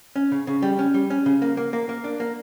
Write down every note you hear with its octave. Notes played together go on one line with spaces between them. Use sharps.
C#4
C#3
C#3
G3
C#4
G3
C#4
C#3
A#3
A#3
A#3
A#3
D4
A#3